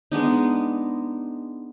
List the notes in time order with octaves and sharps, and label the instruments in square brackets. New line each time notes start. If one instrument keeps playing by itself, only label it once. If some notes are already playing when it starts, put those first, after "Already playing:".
[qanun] G#3 B3 D4 D#4